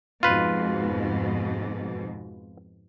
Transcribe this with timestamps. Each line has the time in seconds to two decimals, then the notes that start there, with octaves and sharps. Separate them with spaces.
0.23 F2 G#2 B2 F4 B4